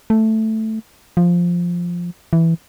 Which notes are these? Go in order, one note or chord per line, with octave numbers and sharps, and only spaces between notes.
A3
F3
E3